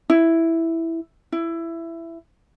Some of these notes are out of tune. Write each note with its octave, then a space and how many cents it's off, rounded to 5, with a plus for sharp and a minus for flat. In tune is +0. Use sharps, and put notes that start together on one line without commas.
E4 +0
E4 +15